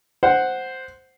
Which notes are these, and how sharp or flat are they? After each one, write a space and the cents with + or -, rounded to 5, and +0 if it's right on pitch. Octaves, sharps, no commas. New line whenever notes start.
C5 +0 F#5 +0